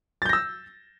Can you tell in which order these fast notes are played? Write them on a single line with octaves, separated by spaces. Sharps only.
A6 G6 A#6 E6